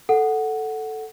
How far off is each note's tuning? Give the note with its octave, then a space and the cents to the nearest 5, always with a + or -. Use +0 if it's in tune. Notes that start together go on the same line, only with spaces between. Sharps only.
A4 +0 F#5 +0